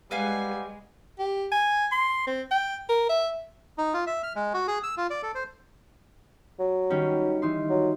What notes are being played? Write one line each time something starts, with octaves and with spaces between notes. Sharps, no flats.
G3 G#3 B4 F5 F#5 G#5
G4
G#5
C6
C4
G5
A#4
E5
D#4
F4
E5
F6
G#3
F#4
G#4
E6
F4
D5
A4
C5
F#3
D#3 G3 C#4
E3 D#4 C6
F#3